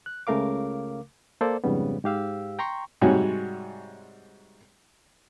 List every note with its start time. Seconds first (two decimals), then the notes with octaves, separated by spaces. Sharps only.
0.06 F#6
0.27 C#2 C#3 A3 A#4 F5 D6
1.41 A#3 A4 C5 D5
1.64 F2 G#2 C#3 G3 B3
2.04 G#2 G4 F5 E6
2.59 G5 A#5 C6 C#6
3.01 G#2 C3 G3 F#4 C#5 G#5